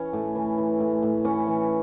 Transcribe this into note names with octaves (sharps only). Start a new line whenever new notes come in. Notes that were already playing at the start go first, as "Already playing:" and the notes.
Already playing: E3 C#4
A2
E3
E3
A2
A2
E3 C#4
E3